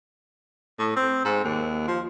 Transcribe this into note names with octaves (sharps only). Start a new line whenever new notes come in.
A2
C4
G#2
D#2
F3